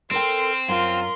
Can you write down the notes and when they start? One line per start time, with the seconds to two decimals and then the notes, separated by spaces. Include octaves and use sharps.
0.11 C4 A4 A#4 G5 C6 F6
0.68 F#2 F4 A#4 C6